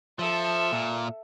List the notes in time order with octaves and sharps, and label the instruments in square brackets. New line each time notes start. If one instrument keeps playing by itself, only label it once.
[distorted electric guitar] F3 [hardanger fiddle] A4 E5
[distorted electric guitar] A#2